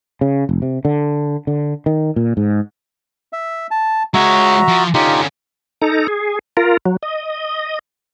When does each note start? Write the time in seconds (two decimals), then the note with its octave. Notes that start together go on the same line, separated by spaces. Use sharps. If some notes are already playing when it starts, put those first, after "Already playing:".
0.21 C#3
0.49 F1
0.62 C3
0.85 D3
1.47 D3
1.86 D#3
2.16 A#2
2.37 G#2
3.33 E5
3.71 A5
4.14 G#3 F#4 C#5 E5 A#5
4.68 F3
4.94 D3 C#4 D#4 F4 G4
5.82 D#4 A4 A#5
6.08 G#4
6.57 F4 A#4
6.86 F#3
7.03 D#5